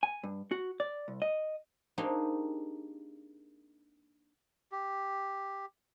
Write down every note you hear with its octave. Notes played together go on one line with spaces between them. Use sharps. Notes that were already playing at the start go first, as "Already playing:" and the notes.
G#5
G2
F#4
D5
C2
D#5
A#3 C4 D4 D#4 G4 G#4
G4